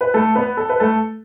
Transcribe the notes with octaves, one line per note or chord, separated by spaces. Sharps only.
B4
A3 A4
B3 B4
A4
B4
A3 A4